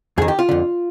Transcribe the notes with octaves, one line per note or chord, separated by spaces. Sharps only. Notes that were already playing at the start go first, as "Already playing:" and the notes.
F2 D#3 G#4
G4
F4
F2 D3